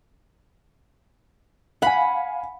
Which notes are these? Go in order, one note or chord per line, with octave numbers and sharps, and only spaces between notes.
F5 F#5 G#5 B5